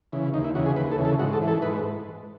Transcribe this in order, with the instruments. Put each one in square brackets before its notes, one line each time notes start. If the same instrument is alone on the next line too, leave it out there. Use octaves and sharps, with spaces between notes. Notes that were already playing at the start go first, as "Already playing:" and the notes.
[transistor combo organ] C#3 E3
D#2 D#4
E4
C#3 E3 F#4
G#4
D#2 B4
A4
C#3 E3
A4
G#2 F#4
A4
E3
A4
G#2 B4